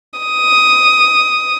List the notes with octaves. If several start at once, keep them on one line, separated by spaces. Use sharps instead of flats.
D#6